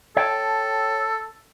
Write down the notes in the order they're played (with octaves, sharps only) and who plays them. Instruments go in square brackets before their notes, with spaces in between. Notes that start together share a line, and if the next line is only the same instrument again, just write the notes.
[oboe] A4 [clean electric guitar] C#5 G5 A5